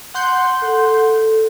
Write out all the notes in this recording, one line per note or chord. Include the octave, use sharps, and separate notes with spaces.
F#5 C6 G6
A4